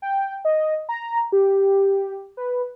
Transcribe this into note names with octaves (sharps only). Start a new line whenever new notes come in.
G5
D#5
A#5
G4
B4